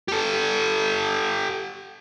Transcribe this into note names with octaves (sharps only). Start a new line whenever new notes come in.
G4 A4